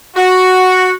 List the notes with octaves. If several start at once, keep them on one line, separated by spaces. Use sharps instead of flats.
F#4